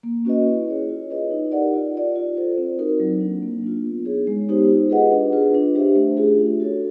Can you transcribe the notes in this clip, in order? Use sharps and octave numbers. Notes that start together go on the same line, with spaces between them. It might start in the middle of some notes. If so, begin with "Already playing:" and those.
A#3
C#4 F#4 B4 D#5
E4
G#4 C#5
F4
G#4 B4 D#5
D#4
G4 A#4 D5 F#5
F4
A#4 D5
F4
A4 C5
C4
D#4 F#4 A#4
F#3
A#3 D4
A#3
D4 F4
B3
D#4 G#4 C#5
G#3
B3 D#4 G4 C5
F4
G#4 B4 D#5 F#5
D4
F4 G#4 B4
D4
G4 C5 E5
A3
C#4 F4 G#4
D4
F#4 A4 C#5